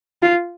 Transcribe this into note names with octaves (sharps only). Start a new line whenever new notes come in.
F4